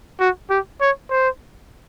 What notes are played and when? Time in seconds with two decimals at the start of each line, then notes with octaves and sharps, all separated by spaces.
0.20 F#4
0.50 G4
0.81 C#5
1.10 C5